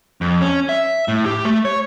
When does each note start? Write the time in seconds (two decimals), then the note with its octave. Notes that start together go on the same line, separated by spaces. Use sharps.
0.21 F2
0.41 C#4
0.69 E5
1.08 A2
1.25 G4
1.45 A3
1.65 C#5